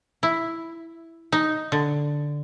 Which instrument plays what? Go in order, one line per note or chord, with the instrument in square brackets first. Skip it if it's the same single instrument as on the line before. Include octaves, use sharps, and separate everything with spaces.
[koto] E4
D#4
D3